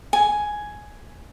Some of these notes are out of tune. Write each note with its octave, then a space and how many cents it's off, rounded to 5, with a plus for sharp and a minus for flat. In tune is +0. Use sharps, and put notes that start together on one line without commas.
G#5 +5